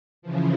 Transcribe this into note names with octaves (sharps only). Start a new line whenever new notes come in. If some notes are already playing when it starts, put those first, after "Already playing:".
C#3 E3 F3